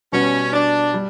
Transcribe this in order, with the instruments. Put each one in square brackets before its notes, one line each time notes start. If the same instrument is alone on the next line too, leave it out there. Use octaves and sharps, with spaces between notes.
[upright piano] B2 G3 B3 F#4 [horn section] C#4
[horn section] D4
[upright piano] G3